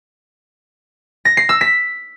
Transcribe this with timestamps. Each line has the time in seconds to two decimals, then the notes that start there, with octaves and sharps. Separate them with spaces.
1.25 A#6
1.37 C7
1.49 E6
1.61 B6